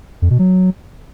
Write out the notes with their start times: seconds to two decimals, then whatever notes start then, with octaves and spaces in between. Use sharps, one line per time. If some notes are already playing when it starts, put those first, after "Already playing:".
0.22 F2
0.30 B2
0.39 F#3